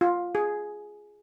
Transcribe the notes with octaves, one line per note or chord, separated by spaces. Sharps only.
F4
G#4